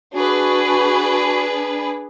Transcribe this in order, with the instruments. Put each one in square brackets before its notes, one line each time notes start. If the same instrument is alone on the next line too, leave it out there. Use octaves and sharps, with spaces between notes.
[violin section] D4 G#4 B4 [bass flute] F#4